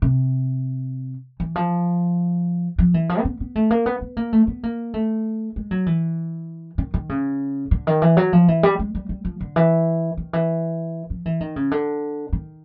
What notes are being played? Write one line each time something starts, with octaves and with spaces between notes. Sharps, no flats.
C3
E3
F3
F3
E3
F3
C4
B3
B3
A3
A#3
B3
B3
A#3
A3
B3
A#3
A3
G#3
F#3
E3
D#3
D#3
C#3
D3
D#3
E3
F#3
F3
E3
G3
G#3
G3
G3
F3
D3
E3
D#3
E3
F3
E3
D#3
C#3
D3
D#3